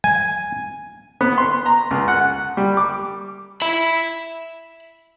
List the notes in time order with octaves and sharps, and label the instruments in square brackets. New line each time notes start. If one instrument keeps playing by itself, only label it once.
[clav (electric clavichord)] G#5
[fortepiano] B3
C6
A#5
C#2
F#5
G3
D6
[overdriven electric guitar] E5 B5